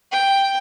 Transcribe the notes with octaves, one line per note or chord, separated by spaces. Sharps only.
G5